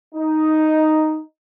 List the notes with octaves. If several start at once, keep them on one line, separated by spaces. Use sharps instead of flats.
D#4